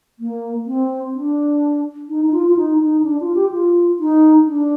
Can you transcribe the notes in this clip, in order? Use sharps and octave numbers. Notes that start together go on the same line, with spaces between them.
A#3
C4
D4
D#4
D#4
F4
F4
D#4
D#4
D4
F4
G4
F4
D#4
D4